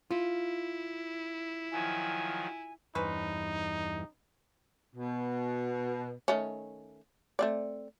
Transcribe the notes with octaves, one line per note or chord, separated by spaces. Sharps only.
E4 F4
D#3 F3 F#3 G#5
E2 G2 C4 C#4 D#4 B4
B2
D#3 A3 C#4
A3 C4 D5